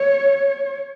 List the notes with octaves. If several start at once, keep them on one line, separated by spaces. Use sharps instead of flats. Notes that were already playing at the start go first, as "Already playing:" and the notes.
Already playing: C#5